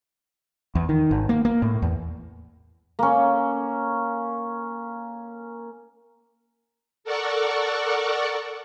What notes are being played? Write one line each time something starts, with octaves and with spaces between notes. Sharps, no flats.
E2
D#3
G#1
A#3
A#3
A2
E2
A#3 C#4
A4 A#4 D5 F#5 C#6